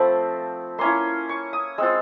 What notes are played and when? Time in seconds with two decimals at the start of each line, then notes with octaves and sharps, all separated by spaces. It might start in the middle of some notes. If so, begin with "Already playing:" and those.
Already playing: F3 A3 C4 B5
0.78 A#3 C#4 E4 C6
1.29 C#6
1.53 D#6
1.78 G#3 C4 F4 E6